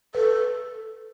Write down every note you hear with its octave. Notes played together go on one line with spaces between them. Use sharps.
A4 B4